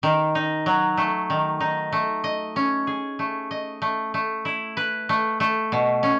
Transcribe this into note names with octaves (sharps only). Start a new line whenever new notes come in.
D#3
D#4
F#3
A3
D#3
D#4
A3
D#5
C#4
G#4
A3
D#5
A3
A3
E4
B4
A3
A3
B2
C#4